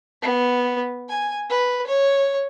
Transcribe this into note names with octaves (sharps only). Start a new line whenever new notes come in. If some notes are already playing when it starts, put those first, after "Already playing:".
B3
G#5
B4
C#5